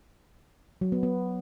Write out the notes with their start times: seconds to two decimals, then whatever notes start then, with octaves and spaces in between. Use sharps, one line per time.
0.81 F#3
0.92 B3
1.03 B3